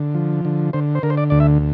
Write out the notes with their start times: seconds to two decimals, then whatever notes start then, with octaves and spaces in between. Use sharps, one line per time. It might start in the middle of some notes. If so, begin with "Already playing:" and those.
Already playing: D3
0.15 F3
0.45 D3
0.73 D3 C5
0.95 C5
1.03 D3 A#4
1.10 C5
1.17 D5
1.30 D2 D5
1.40 E5